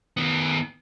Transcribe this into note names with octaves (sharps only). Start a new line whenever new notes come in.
D#3 B3